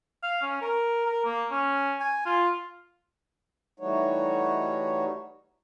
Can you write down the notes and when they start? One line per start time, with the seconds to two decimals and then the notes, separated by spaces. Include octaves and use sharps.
0.23 F5
0.42 C#4
0.62 A#4
1.06 A#4
1.25 A#3
1.51 C#4
2.00 G#5
2.26 F4
3.80 E3 G3 A3 D#4 F#4 C#5